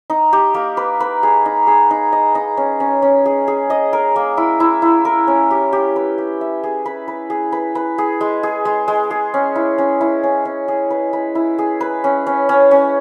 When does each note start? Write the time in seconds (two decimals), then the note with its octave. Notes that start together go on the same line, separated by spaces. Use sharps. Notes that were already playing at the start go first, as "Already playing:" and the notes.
0.10 D#4
0.33 G4
0.54 A#3
0.77 B4
1.00 B4
1.23 G#4
1.45 D#4
1.67 G#4
1.91 D#4
2.12 D#5
2.35 D#4
2.57 C#4
2.80 C#4
3.02 C#4
3.25 G#4
3.48 G#4
3.70 D#5
3.93 A#4
4.16 A#3
4.37 E4
4.60 E4
4.82 E4
5.05 A#4
5.27 C#4
5.51 G4
5.73 G4
5.96 B4
6.18 G4
6.41 E5
6.63 G#4
6.86 B4
7.08 B4
7.30 G#4
7.52 B4
7.75 B4
7.98 G#4
8.21 G#3
8.43 G#4
8.65 G#3
8.88 G#3
9.11 G#4
9.34 C#4
9.55 E4
9.78 C#4
10.01 E4
10.23 C#4
10.45 C#4
10.68 G#4
10.90 B4
11.13 B4
11.35 E4
11.59 G#4
11.81 B4
12.04 C#4
12.27 C#4
12.49 C#4
12.71 C#4